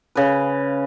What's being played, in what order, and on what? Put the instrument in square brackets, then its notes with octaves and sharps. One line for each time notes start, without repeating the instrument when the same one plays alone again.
[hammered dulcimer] C#3 B4